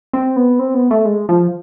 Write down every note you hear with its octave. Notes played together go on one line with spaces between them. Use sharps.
C4
B3
C4
B3
A3
G#3
F3